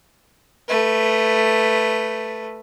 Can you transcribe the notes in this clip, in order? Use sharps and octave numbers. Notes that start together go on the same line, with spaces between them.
A3 B4